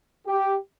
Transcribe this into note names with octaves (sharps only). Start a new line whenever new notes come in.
G4